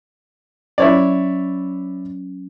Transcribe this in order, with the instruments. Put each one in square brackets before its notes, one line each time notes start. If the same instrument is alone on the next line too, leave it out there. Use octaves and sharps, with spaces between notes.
[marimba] F#3 C#4 [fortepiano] E4 C#5 D5